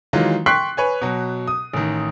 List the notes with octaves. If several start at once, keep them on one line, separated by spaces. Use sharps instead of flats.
D#3 E3 F#3 G#3 F4
G5 C6 C#6 F#6 B6 C7
B4 C#5 G#5
B2 F#3
D#6
A1 D#3